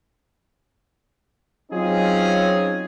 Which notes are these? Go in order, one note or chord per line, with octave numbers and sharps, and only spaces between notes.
F#3 C4 C#4 D#4 F4 G#4